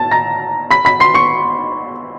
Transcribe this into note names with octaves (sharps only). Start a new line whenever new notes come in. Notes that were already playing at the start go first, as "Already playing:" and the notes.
Already playing: A5 A6
A#5 A#6
B5 B6
B5 B6
C6 C7
C#6 C#7